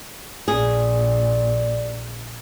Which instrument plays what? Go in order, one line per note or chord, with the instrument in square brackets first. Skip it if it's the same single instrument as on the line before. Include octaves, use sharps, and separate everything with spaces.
[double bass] A#1 [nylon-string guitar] G#4 [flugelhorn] D5